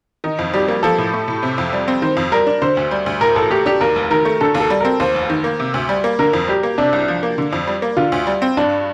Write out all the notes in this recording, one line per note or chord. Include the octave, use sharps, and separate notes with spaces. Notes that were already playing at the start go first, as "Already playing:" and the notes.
D#3 D#4
F2
G3 G4
A#3
F3 A4
A2
A3
A2
C3
F2
G3
C4
D#3 C5
F2
G3 A#4
D4
D3 C5
D2
G3
D2
A2 A#4
A1 A4
A3 G4
D4 G4
D#2 A#4
F1
D#3 A#4
A3
D3 A4
D#2
A4
G3
C4 A#4
D#2 C5
F1
D#3
A#3
C3
D2
G3
A#3
D3 A#4
F2
G3 G4
A#3
C3 D4
C2
F3
A#3
D3
F2
G3
A#3
D3 F4
D2
G3
C4
G2 D4